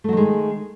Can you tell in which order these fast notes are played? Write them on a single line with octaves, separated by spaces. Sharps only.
A3 F#3 D#3 G#3